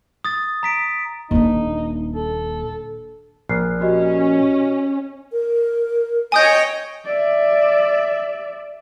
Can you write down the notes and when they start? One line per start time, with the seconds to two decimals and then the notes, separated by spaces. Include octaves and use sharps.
0.24 D#6 A6
0.63 A#5 B6 D7
1.31 D#1 A#3 D4 D#4
2.16 A4
3.49 A#1 F6 F#6 C7
3.81 C#4 F#4 G4 D#5
5.32 A#4
6.32 C#5 D#5 G5 G#5 D#6 G6
7.05 D5 E5